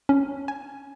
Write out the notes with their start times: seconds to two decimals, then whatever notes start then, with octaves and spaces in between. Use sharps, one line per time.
0.09 C#4
0.48 G#5